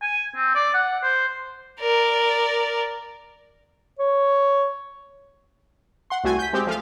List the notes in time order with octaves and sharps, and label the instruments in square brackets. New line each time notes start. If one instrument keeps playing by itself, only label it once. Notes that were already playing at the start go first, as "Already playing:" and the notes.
[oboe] G#5
C4
D5
F#5
C5
[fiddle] A#4 D5
[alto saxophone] C#5
[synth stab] F#5 C6
C2 A3 F#4 G#5
G6 B6
G#3 C4 G4
F3 A3 F5